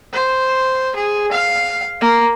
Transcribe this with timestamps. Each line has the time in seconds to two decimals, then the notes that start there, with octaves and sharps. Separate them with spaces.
0.13 C5
0.96 G#4
1.32 F5
2.01 A#3